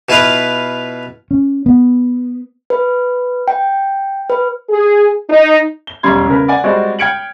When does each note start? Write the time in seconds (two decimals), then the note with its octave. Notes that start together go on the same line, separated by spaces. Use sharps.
0.09 B2 E4 F4 B4 F5
1.31 C#4
1.66 B3
2.70 B4
3.48 G5
4.30 B4
4.70 G#4
5.30 D#4
5.87 G7
6.03 E1 B1 G3 C#4 C6 G#6
6.28 C#3 A#4 B4
6.48 D5 F#5 G#5
6.64 G3 G#3 C4 F#4 D5
6.99 G5 F6 G#6 C#7 D7 F#7